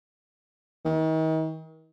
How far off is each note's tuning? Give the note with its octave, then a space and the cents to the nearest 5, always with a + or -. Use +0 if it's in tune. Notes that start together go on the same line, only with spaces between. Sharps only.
D#3 +40